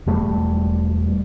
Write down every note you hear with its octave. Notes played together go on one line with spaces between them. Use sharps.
E1 G3 A3